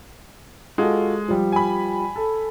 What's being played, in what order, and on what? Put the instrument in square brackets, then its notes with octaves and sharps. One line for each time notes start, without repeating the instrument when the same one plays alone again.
[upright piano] G#3 [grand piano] F4 F#4 A4
[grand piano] F3 G3
[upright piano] G#5 B5
[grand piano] A4